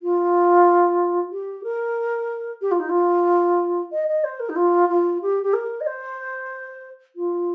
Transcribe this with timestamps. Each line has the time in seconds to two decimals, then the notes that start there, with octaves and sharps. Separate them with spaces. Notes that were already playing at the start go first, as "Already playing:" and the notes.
0.02 F4
1.31 G4
1.63 A#4
2.61 G4
2.71 F4
2.79 D#4
2.89 F4
3.92 D#5
4.08 D#5
4.24 C5
4.39 A#4
4.49 D#4
4.55 F4
4.88 F4
5.21 G4
5.43 G4
5.53 A#4
5.80 D#5
5.86 C5
7.15 F4